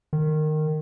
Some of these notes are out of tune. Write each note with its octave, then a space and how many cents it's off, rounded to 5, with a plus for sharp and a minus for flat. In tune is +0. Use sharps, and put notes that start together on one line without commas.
D#3 -15